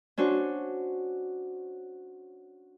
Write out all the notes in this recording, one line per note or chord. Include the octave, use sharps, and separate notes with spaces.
C#4 D4 F#4 C5